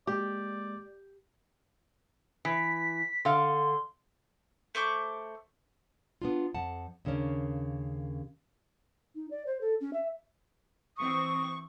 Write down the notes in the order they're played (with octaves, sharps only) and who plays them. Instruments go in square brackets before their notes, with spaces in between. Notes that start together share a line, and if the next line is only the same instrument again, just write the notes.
[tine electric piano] G#3 A#3 [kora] G4 [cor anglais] D5
[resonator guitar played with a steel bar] E3 [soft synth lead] B6
[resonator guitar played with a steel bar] D3 F5 [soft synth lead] C6
[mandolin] A3 C5 C#6 D6
[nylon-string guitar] B3 D4 F4
F2 F#5 A5
D#2 C#3 A#3 C#4 D4
[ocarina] D#4
D5
C5
A4
C#4
E5
[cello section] E3 C4 [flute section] C#6 [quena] D#6